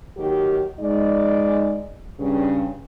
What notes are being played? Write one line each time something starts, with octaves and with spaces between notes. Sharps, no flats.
D#2 D#3 F#3 G4
G#3 D#4 D5
G2 C#3